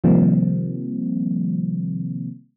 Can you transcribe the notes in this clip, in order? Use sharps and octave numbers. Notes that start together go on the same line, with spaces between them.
C3 D#3 F3 G3 A#3 C4